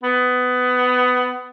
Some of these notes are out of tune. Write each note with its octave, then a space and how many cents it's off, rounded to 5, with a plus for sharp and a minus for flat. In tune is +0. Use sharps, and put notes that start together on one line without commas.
B3 +20